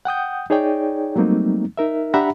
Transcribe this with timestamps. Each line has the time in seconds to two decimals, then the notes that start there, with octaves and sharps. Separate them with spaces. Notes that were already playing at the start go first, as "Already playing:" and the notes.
0.05 F#5 G5 D#6 G6
0.50 D#4 G#4 C#5 D5 G5
1.16 F#3 G3 A3 A#3 C4 D#4
1.77 D#4 A#4 E5
2.14 D4 G4 E5 F#5 A#5 B5